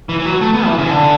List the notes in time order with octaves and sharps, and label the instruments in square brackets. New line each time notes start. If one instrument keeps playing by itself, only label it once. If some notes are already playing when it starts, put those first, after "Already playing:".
[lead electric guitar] E3
E3
F#3
A3
B3
E3
C#3
E3
D3